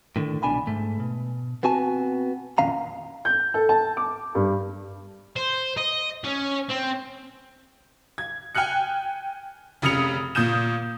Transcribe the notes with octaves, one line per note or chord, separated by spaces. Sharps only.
A2 D3 D#3
C2 B2 D4 G#5 B5
G#2 A3
B2
B3 C4 F#4 G#5 A5
F2 A#2 D#3 C#4 F5 A#5
G6
A4
A5
D6
G2
C5
D#5
C#4
C4
G#6
G5 G#5 F6 F#6 C#7
F1 C#3 D#6 C#7 F7
A#2 D#6 G6 E7